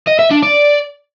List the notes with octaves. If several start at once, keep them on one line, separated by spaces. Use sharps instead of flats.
D#5
E5
D4
D5